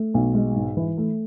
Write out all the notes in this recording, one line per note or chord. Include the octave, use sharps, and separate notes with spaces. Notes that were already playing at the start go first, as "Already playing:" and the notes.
Already playing: A3
B1
G#3
G#2
E3
A3